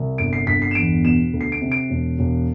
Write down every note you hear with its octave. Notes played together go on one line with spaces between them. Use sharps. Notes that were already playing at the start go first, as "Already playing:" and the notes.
Already playing: C2
G1 D7
C7
G1 B6
C7
E7
E2 D7
B2 E7
D2
C7
D7
C3
D7
E1
E1